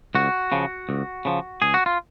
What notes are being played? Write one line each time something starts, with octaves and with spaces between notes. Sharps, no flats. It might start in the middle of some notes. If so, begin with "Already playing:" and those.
C#2 F#4
C#3 F3
C#2
C#3 F3
C#2 G#4
F#4
F4